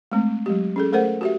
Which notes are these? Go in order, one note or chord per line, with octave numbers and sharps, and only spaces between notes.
G#3 A3 C4
F#3 G#3 G4
C#4 G#4 A4
A3 A4 A#4 C5 F#5
F#4 G4 E5